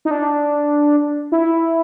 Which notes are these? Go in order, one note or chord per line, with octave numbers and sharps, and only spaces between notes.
D#4
D4
E4